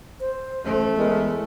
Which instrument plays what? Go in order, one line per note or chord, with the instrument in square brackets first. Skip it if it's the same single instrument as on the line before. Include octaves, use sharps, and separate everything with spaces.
[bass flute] C5
[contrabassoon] A1 [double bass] A3
[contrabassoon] E2 [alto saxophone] G#3 [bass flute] A#4